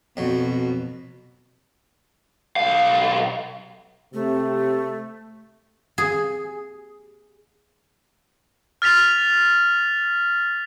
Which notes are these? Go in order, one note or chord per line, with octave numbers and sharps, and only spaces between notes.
F2 B2 F#3
B1 F5
C3 A3
G#4
F6 A6 B6 F7